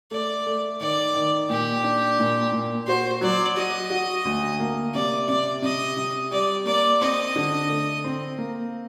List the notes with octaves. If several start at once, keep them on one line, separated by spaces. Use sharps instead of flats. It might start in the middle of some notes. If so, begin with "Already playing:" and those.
A3 D5
A3
D#3 D5
D#3
A#2 G4
D4
A#2
A#2
F#4 C5
F#3 D5
F#4 D#5
F#4
D2
A#3
C3 D5
C3 D5
C3 D#5
C3
G3 D5
A#3 D5
C4 D#5
D3
A3
C4
A#3